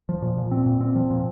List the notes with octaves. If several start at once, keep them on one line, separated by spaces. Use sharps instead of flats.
F3
A#2
A#2
C4
A#2
C4
F3
A#2